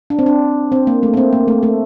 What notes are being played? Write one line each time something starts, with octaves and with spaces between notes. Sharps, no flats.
D4
C4
D4
C4
A#3
A3
A#3
C4
A#3
A3
A3